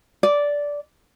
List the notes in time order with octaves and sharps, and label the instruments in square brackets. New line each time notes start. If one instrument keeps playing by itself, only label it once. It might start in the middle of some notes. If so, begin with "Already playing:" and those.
[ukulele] D5